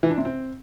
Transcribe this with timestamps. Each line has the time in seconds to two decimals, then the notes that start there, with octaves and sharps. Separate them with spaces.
0.03 E3
0.10 D4
0.18 C3
0.25 C4